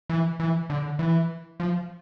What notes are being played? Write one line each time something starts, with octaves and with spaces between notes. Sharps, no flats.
E3
E3
D3
E3
F3